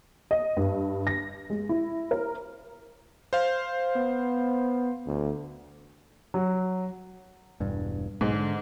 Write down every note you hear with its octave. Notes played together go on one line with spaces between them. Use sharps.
D#5
G2
A#6
G#3
E4
A#4
C5 F5
B3
D2
F#3
E1 G2
B1 G#2 B2 G#3
D3